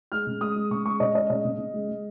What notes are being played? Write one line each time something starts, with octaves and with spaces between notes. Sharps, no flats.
G#3 F6
C#3
G#3 D#6
G#3
C#3 C#6
G#3 C#6
C#3 D#5
G#3 D#5
C#3 D#5
C#3
C#3
G#3
G#3